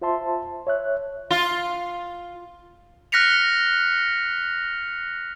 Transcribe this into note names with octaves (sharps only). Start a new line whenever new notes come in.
F4 C5 E5 A5 C6
C#5 E5 F#6
F4
F6 F#6 A#6 B6 C#7 F7